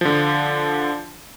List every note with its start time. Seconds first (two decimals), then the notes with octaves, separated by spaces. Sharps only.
0.01 D3 F3